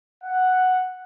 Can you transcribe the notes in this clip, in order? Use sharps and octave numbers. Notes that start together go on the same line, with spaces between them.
F#5